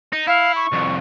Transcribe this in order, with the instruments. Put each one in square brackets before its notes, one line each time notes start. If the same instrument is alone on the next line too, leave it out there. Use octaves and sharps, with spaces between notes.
[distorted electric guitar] D#4
[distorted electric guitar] E4 [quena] F5
[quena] C#6
[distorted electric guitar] C2 F2